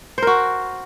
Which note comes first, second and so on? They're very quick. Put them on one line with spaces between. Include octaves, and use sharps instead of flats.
C5 A#4 F#4